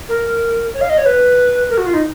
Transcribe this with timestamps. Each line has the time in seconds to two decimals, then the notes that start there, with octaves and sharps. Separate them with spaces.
0.09 A#4
0.74 C#5
0.81 F5
0.90 D#5
0.98 C#5
1.06 B4
1.70 A#4
1.78 F#4
1.86 F4
1.94 D#4